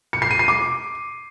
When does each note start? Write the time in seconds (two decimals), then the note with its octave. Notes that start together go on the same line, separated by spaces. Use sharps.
0.13 C#7
0.22 C7
0.31 D#7
0.39 C7
0.48 D6